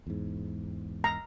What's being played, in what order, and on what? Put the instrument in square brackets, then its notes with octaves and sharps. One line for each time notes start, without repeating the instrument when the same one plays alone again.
[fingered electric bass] E2 G#2
[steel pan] A#5